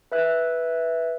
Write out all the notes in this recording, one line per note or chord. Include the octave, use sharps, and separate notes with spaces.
B4 E5 F#6